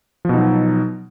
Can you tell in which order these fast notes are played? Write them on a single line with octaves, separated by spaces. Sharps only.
F3 B2 D#4 F#3